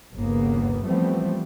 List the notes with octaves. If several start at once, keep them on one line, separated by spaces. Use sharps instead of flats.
G1 D#2 C#3 A#3 B3
E3 F3 G3 A3 B3 C4